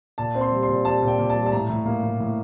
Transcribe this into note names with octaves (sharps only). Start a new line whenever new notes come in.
A#2 A5
C4
C6
G3
C6
A#2
G3 A5
A#2
G5
A#2
A5
G3
A5
A2 A#5
A2
A#3
A2
A2